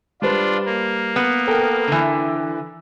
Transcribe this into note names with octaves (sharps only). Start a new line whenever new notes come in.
G3 D4 F4 B4 C5
A#3
B3
A4 A#4 G5
D3 E3